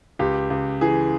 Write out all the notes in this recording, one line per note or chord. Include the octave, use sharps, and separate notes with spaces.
C#2 G4
C#2
E3 G#4